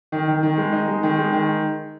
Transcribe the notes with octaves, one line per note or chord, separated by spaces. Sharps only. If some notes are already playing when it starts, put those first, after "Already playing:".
D#3
D#3
D#3
G#3
D#4
G#3
D#3
G#3
D#3